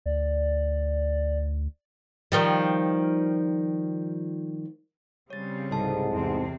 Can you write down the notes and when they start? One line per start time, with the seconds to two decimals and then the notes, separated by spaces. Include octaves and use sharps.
0.06 D2 D5
2.32 D#3 F3 G3
5.30 C#3 G3 C4 C#5 A6
5.71 C2 G#2 A4 D#5 A5
6.12 E2 C3 C4